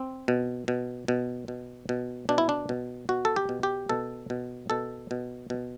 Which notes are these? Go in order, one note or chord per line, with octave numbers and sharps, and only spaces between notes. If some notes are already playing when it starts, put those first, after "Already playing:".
Already playing: C4
B2
B2
B2
B2
B2
B2 D4
E4
D4
B2
B2 F#4
A4
G4
B2
G4
B2 A4
B2
B2 A4
B2
B2